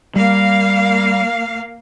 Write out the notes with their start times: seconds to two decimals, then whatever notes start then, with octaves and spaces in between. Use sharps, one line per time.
0.16 G3 A#3 F5